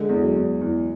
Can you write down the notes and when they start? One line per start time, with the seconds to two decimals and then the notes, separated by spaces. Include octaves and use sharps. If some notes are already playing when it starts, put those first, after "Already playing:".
Already playing: D3 G#3
0.09 E2
0.22 F#3
0.36 E2
0.61 E2 E3